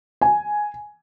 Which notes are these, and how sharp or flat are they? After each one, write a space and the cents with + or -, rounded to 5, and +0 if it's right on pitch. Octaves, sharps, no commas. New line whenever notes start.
G#5 +5